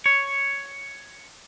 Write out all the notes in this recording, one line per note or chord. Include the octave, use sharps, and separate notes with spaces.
C#5